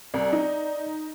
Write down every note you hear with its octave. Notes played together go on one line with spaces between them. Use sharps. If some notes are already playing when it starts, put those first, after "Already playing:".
C2 D5
D#4